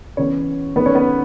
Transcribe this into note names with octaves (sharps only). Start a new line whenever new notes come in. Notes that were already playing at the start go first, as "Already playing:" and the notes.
C#3 E3 B3 C#4 C#5
F#2 D#3 A3 B3 B4
C#4 C#5
B3 B4